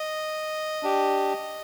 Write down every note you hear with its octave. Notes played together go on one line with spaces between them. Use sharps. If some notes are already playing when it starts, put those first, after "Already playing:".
Already playing: D#5
D4 G4